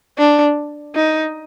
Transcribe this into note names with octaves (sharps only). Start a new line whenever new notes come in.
D4
D#4